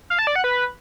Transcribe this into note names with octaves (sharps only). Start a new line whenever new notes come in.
F5
A5
D5
F#5
B4